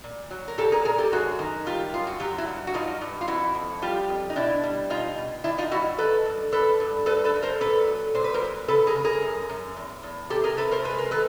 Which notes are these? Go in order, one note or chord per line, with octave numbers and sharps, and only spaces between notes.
A#2
F#3
A#4
A#2 G4 A4
G#4 A#4
A#2 G#4 A#4
G4 A4
F#2 F#4 G#4
D#3
G3 F4 G4
F#2 F4
F#4
F#3 F4 G4
E4 F#4
G2
F#4
G2 D#4 F4
G2
F4
F2 E4 F#4
F2
G3 F4 G4
F2
D#4
B2 D4 E4
G3
B2 D#4 F4
B2
D#3 D4 E4
D#4 F4
G2 E4 F#4
D#3 A4 B4
G2
G2 A4 B4
G2
G2 A4 B4
A4 B4
G2
A#4 C5
A#2 A4 B4
F#3
A#2 C5
B4
A#4 C5
F#3
C#3 A4 B4
G#4 A#4
C#3
G#4 A#4
F#2
F#2
E2
E2
C3 G4 A4
G#4 A#4
C3 A4 B4
A#4 C5
G#3 B4
A#4
D#3 A4 B4